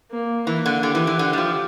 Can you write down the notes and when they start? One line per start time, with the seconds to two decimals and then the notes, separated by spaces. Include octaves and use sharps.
0.11 A#3
0.47 E3 A#3
0.66 D3
0.83 D3 G4
0.95 E3
1.07 E3
1.19 D3
1.33 G3
1.38 F3